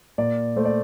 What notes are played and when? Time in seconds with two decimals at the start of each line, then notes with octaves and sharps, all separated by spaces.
0.18 A#2 D5
0.56 A3 C5
0.65 D5